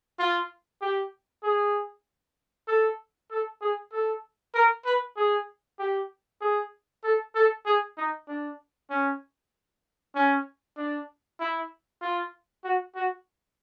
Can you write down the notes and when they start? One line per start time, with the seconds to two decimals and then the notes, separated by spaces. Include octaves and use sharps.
0.19 F4
0.81 G4
1.43 G#4
2.68 A4
3.30 A4
3.61 G#4
3.92 A4
4.54 A#4
4.85 B4
5.17 G#4
5.79 G4
6.41 G#4
7.04 A4
7.35 A4
7.66 G#4
7.97 D#4
8.28 D4
8.90 C#4
10.15 C#4
10.77 D4
11.40 E4
12.01 F4
12.64 F#4
12.95 F#4